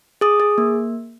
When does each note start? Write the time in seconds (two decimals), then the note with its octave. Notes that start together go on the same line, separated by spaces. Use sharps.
0.21 G#4 D#6
0.40 G#4
0.58 A#3